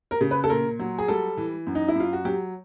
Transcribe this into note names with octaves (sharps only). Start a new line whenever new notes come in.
A#4
C#3
B4
A4
A#2 A#4
F#3
G#4
G3 A4
E3
F#2
D#4
E4
F#2 F4
F#4
F#3 G4